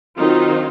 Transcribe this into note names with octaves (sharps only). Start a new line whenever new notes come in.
D#3 F#3 C4 D#4 F4